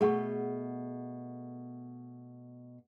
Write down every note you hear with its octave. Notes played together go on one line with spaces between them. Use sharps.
B2 A3 G#4 F#5 C#6